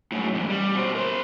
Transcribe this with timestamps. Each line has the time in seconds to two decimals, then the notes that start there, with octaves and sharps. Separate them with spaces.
0.12 F#2 A2
0.34 E2 G#2
0.50 G3
0.75 B2 C5
0.95 A#4 C5